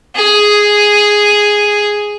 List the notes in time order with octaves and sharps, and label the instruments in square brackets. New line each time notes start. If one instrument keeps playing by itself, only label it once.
[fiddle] G#4